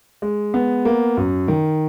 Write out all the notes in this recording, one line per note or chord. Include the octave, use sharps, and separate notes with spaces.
G#3
B3
A#3
F#2
D#3